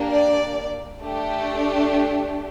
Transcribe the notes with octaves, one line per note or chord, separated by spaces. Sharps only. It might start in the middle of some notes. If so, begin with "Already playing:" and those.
Already playing: A#3 D4 G4
D5
A3 D4 G4